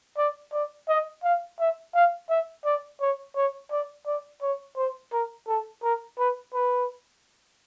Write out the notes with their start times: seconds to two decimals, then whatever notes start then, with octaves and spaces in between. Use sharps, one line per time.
0.18 D5
0.53 D5
0.89 D#5
1.24 F5
1.59 E5
1.95 F5
2.30 E5
2.65 D5
3.01 C#5
3.36 C#5
3.71 D5
4.07 D5
4.42 C#5
4.77 C5
5.12 A#4
5.48 A4
5.83 A#4
6.19 B4
6.54 B4